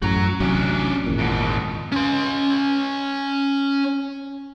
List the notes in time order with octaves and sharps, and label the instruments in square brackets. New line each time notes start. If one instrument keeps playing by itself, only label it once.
[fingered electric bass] A1 F#2 A2 [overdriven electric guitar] F#4 A#5
[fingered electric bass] A1 C3 F#3 [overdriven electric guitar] C#4 D4
[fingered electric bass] G#1 E2 A#2
[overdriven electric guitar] G#2 B2
[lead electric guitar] C#4 C6